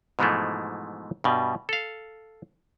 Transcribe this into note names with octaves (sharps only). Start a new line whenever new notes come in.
G#2 B2 E3 F3 G#3 A3
G2 B2 G3
A4 F5